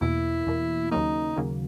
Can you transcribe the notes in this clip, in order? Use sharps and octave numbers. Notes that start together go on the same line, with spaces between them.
E2 B2 A#3 E4
E2 B2 A#3
D#2 C#3 F#3 A#3 D#4
D#2 C#3 F#3 A#3